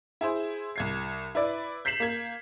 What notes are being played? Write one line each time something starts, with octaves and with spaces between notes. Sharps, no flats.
E4 G#4 C5
C2 G#6 C7
E4 B4 D5
G6 B6 C7 E7 F#7
A#3 G#6